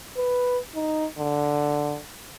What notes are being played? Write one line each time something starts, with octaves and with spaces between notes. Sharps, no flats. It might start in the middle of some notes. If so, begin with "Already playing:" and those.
B4
D#4
D3